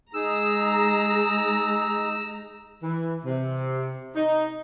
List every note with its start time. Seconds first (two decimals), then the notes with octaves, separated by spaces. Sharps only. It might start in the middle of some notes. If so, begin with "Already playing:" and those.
0.14 G#3 D#4 G#4 A#5 E6
2.83 E3
3.25 C3
4.16 D#4